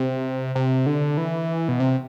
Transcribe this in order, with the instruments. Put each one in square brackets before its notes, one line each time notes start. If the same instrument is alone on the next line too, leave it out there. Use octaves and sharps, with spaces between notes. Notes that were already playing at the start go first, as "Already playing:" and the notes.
Already playing: [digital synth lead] C3
C3
D3
E3
B2
C3